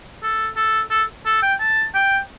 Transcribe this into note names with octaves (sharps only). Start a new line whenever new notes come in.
A4
A4
A4
A4
G5
A5
G5